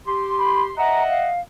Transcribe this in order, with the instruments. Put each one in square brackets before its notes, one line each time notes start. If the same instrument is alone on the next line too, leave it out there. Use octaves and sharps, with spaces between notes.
[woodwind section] G4 C6
[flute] B5
[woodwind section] D#5 E5 F#5 [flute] A#5
[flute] F5